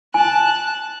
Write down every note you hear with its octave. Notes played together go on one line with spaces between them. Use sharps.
G#5 A5 F#6